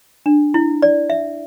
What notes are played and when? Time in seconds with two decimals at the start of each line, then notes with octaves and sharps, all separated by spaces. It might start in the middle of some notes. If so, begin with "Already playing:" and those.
0.26 D4
0.54 E4
0.82 D5
1.10 E5